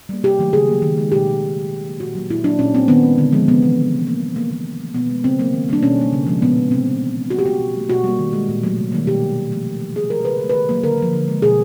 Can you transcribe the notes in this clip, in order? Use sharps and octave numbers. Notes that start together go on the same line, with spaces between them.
G3 A#3
C3 G4
D#3 F#3 A3
C#3 G#4
F#3 A#3
D#3
G#3
B2 G4
G#3
B2
G#3
C#3
F#3 A#3
A#2 F#4
F#3 A#3
A#2 E4
F#3 A#3 D4
A#2 C#4
G3 A#3 C4
D#3 B3
G#3
D3
F3 G#3
C3 B3
E3 G#3
C#3
F3 A#3
D3 A#3
G3 A#3
C3 A#3
D#3 G3 A#3
C3
F3 A3
B2 B3
G#3
C#3 C4
F#3 A#3
D#3
G3 A#3 D4
B2 C#4
G3 A#3
C#3
F3 G#3
A#2 B3
F3 G#3
C3 C4
E3 G3
C#3
E3 G3
A#2 F#4
G4
G3 A#3 F#4
B2
F#3 A3
B2 F#4
G3 A#3
D#3
G#3
A#2
F#3 A3
C3
D#3 G3 A#3
B2 G4
G#3
C3
F3 A3
C3
E3 G3
C#3 G#4
F3 G#3 A#4
C#3 B4
F#3
A3
D#3 B4
F#3 A#3
D3 A#4
F3 A#3
D3
F3 G#3
B2 G#4